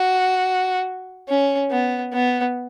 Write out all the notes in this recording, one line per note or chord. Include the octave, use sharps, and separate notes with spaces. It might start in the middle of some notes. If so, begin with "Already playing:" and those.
Already playing: F#4
C#4
B3
B3